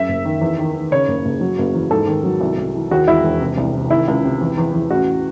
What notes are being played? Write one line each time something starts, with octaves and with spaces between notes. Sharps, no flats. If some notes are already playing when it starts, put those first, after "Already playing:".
Already playing: F#2 E5
F#1
D#3
E2
D#3
D#3
C#3 C#5
F#1
F#1
F#3
F#1
E2
G#2 A4
D#3
F#3
C2
C2
E3
D#2 F#4
E1 E4
E1
C3
C2
C3
D#3 E4
C#2
C3
E2
E2
E2
A1 F#4